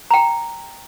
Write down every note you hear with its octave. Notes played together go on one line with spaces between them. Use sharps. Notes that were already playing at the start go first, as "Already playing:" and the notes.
G5 A#5